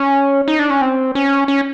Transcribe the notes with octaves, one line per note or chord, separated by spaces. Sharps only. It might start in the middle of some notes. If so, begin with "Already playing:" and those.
Already playing: C#4
D#4
D4
C#4
C4
C#4
C#4